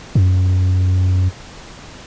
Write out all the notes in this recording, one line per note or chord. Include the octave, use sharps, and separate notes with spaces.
F#2